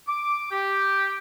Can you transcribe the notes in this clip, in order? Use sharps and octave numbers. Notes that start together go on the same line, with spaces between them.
D6
G4